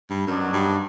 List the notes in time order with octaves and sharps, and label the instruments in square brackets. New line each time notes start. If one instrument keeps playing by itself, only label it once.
[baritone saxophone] G2
[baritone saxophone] F#2 [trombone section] D#3 F#3 B3 D4
[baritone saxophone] G2